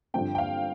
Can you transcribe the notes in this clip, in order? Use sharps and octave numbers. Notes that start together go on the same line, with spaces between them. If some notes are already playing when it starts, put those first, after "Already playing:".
G2 D3 F3 C4 G5
G5
F5